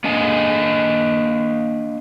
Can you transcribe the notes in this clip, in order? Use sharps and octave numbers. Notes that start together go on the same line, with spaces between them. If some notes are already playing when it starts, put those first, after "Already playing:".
A#3 D4 D#5 G#5